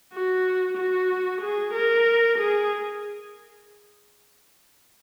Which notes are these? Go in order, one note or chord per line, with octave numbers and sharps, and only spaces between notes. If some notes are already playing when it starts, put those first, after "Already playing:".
F#4
F#4
G#4
A#4
G#4